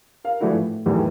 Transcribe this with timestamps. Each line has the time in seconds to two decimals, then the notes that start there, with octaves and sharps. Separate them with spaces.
0.24 A#4 F5
0.40 E3 F3 A3 D4 E4 F#4
0.52 A2
0.86 B1 E2 A2 D#3 E3